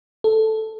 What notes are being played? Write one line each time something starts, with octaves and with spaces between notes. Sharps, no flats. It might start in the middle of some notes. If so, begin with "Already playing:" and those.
A4